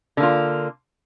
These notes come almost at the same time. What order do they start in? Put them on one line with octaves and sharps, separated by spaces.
D3 A#3 F4